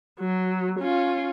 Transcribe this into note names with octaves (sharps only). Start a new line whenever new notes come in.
F#3
C#4 F4